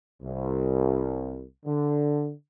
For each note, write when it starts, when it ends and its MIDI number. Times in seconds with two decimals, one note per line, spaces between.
0.22 1.41 36
1.66 2.32 50